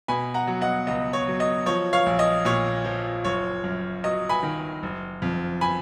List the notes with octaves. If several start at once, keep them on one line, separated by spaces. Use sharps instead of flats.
B2 G#5 B5
F#5 A#5
F#3
D#5 F#5
C#2 D#5
C#5
F#3
D#5
F3 C#5
C#5 F5
A#1
D#5
A#2 C#5
F3
F#1 C#5
F#2
F#3 D#5
G#5 B5
D#3
F#1
F2
G#5 B5